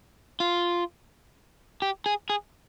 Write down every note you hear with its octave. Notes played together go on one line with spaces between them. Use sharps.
F4
G4
G#4
G#4